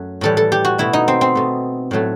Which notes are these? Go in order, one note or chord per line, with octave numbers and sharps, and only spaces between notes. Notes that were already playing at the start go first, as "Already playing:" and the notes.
Already playing: F#2 F#3 A3
A2 E3 G3 A4
A4
G4
F#4
B2 A3 E4
D#4
C4
C4
B2 A3
A2 F#3 A3